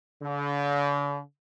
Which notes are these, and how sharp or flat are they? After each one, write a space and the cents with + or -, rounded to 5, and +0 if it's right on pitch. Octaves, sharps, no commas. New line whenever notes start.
D3 -45